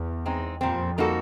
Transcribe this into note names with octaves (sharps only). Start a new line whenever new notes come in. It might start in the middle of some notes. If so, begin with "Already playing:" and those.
Already playing: E2
G#3 C4 D#4
F2 A#2 G3 C4
G3 A#3 D#4 F#4 A4